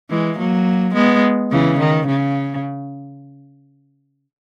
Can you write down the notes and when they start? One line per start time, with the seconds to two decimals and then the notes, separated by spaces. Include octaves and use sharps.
0.10 E3 G#3
0.38 F#3 A#3
0.94 G#3 B3
1.51 C#3 E3
1.80 D#3
2.07 C#3